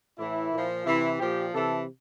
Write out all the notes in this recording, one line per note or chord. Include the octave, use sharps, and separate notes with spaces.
A2 E3 E4
A#2 F3
C3 E3 E4
A#2 F3 G4
C3 E3 A4